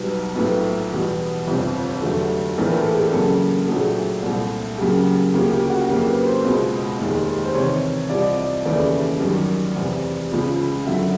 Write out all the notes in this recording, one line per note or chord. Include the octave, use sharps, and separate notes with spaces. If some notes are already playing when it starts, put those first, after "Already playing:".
Already playing: B1 B2 G3 B4
B1 A2 F3 A3 B4
E2 B2 G3
G1 F2 C3
F1 F2 D3 F#3 A3
A#1 A2 E3 A3 A#4
A4
G#4
G4
F#2 C#3 F#3 A#3 A4
A#1 A#2 F#3 A3 G#4
C2 A#2 F3 A3
F#2 C#3 F#3 A#3 G4
D2 C#3 F3 A#3 G4
G4
F#4
F2 C#3 F#3 A#3 G4
B4
C5
C#2 B2 G#3
F1 D#2 D#3 G#3
C5
E2 C3 D#3 C#5
C2 C3 F3 D5
D#5
D5
F1 D#2 C#3 E3 A3 D5
F#2 D#3 G3
F1 E2 C3
C#2 C#3 F3
F#2 D3 F#3 E5